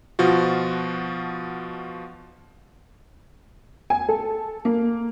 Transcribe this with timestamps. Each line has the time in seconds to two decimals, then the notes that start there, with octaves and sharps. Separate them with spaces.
0.19 B2 F3 F4 F#4
3.90 G#5
4.09 A4
4.65 A#3